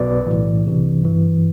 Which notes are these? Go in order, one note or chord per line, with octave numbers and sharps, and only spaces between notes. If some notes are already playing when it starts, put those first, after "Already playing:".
Already playing: B1 B2 B4 D5
B1 A2 E3
C2 C3 E3
G1 G2 E3